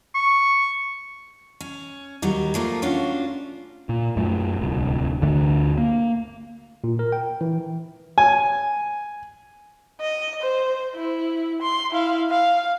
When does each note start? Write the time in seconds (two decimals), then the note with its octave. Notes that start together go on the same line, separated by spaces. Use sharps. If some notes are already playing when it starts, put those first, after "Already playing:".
0.15 C#6
1.61 C#4
2.22 D#2 F#3 G3
2.54 F3 A3 A#3
2.82 C#4 D4 F4 F#4
3.89 A#2
4.17 F#2 A3
4.59 D1 C2
5.21 G1 D2 D3 A3
5.78 A#3
6.84 A#2
6.99 A#4
7.12 G5
7.41 E3
8.18 G#5
10.00 D#5
10.42 C5
10.95 E4
11.62 C6
11.91 E4 F5
12.30 F5